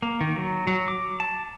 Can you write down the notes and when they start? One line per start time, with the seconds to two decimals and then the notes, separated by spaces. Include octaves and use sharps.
0.02 A#3
0.21 D#3
0.36 F#3
0.67 F#3
0.88 D6
1.20 A5